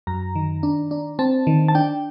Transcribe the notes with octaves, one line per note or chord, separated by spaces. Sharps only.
F#2 A#5
D#3
D4
D4
C4 A5
D#3
A5
D4 G5